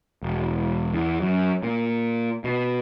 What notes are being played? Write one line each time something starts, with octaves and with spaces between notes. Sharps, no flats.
E1
E2
F#2
A#2
B2